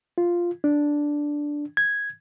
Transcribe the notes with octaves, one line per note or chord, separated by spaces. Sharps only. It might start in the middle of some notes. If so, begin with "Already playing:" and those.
F4
D4
G#6